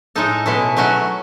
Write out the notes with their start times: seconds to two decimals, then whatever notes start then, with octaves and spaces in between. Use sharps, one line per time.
0.16 A2 G#3 D#4 A4
0.46 B2 G#3 C#4 E4 A4
0.77 F#3 A3 C#4 F#4